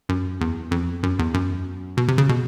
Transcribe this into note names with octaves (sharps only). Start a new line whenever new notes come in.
F#2
E2
F2
F#2
E2
F#2
B2
C3
C#3
B2